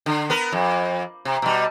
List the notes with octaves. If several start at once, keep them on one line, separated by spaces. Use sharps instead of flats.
D3
B3 A#4
F2
C3
B2 G3